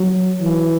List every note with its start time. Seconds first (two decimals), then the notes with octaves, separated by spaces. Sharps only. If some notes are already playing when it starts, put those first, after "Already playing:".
Already playing: F#3
0.41 E3